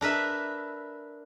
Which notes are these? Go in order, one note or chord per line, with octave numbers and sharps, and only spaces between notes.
D4 A#4 B4 E5